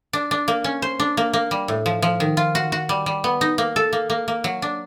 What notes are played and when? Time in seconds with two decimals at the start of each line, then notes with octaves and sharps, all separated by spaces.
0.13 D4
0.31 D4
0.48 A#3
0.64 C#4
0.82 C5
1.00 D4
1.17 A#3
1.33 A#3
1.51 G3
1.68 A2
1.86 F3
2.02 F3
2.20 D#3
2.37 F4
2.55 F#4
2.72 F#4
2.89 G3
3.06 G3
3.24 B3
3.41 D#4
3.58 A#3
3.76 A4
3.93 A#3
4.10 A#3
4.28 A#3
4.44 F#3
4.62 D4